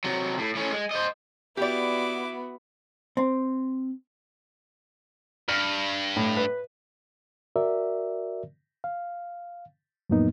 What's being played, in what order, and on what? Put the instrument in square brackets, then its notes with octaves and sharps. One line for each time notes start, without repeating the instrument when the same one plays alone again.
[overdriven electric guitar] C3 F#3
A2
A2 C#4
G#3
C5 D#5
[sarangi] B3 [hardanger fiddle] E4 D6 [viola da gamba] F#4 [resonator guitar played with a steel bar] G4 D5
[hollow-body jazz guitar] C4
[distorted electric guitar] G2 [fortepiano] F6
[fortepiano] A2
B4
[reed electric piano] F#4 A#4 D5 E5
F5
F2 A2 F#3 A#3 B3 D#4